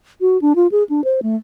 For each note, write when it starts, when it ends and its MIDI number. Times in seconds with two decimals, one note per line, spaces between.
0.21 0.40 66
0.42 0.53 62
0.56 0.67 65
0.72 0.83 68
0.90 1.04 62
1.04 1.20 72
1.23 1.36 57